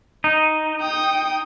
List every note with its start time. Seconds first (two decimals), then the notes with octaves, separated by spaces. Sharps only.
0.24 D#4
0.81 G5 D#6